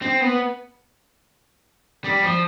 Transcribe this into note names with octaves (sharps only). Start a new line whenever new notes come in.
C4
B3
G3
F3